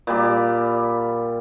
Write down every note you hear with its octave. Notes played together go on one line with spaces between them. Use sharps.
A#2 G3 D6